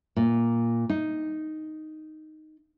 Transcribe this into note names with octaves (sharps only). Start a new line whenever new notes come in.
A#2
D#4